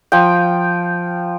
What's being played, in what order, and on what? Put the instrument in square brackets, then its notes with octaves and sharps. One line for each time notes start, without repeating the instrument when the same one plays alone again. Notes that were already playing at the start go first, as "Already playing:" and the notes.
[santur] F3 G5